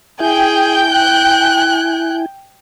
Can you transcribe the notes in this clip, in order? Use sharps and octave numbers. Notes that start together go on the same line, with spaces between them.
E4 G#4 G5 G#5 G6
F#6